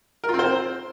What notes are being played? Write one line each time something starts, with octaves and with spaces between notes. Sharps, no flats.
A#4
F4
C4
C5